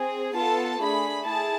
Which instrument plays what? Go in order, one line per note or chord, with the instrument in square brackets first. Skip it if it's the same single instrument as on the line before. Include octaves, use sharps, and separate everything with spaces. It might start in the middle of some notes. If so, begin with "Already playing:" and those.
Already playing: [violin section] C4 G#4
B3 F4 A4 A5
A3 D4 G#4 B5
E4 G#4 A5